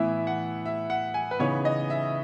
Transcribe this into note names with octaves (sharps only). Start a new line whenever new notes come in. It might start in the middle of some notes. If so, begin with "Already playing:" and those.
Already playing: A2 E3 B3 E4 E5
F#5
E5
F#5
G#5
B4
C#3 E3 B3 D#4 C#5
D#5
E5